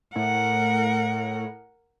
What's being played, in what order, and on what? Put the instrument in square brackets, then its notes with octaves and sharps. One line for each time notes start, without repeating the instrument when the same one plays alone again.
[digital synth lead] A2 [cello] A#4 F#5